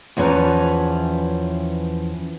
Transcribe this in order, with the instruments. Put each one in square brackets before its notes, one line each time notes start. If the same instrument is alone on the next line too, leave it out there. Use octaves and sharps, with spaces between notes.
[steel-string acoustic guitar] E2 E3 F3 C#4 B4 A#5